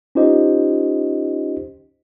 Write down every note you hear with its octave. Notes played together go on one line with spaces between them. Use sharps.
C#4 D#4 F4 G4 C5 D#5